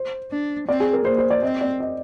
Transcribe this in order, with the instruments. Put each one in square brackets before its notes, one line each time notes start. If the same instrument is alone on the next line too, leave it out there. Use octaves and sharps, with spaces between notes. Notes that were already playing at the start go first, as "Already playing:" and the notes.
Already playing: [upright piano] C5
[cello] D4
[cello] C4 [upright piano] D5
[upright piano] G#4
A#4
[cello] A#3 [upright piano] C5
[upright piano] C5
D5
[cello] C4 [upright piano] D#5
[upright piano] D5
D#5